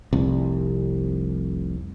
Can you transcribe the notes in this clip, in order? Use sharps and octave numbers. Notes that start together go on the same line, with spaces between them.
F1 C2